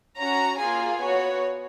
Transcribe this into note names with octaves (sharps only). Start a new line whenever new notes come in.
C#4 F#4 A#5
A#3 F4 G#4 G#5
B3 F#4 C#5